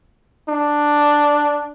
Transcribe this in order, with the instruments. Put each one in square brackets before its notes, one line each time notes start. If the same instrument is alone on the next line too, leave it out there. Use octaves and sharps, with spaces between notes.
[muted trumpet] D4